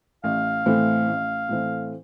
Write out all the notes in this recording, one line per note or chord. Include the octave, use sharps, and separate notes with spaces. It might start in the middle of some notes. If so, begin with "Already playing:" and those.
A1 F5
A2 E3 A3 C4
A1
A2 E3 A3 C4